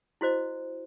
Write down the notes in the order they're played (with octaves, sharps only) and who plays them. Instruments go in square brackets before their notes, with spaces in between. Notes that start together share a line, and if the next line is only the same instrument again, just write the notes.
[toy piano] E4 F#4 C5 D#5